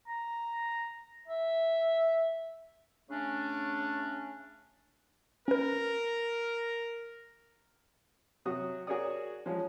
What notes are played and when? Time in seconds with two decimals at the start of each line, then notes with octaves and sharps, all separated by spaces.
0.08 A#5
1.28 E5
3.09 C#3 A3 C#4 D4
5.48 C#4 A#4 B4
8.45 C3 F#3 F#4 D#6
8.87 F#4 G#4 A#4 C#5 D5 D#6
9.46 F3 F#3 G#3 C#4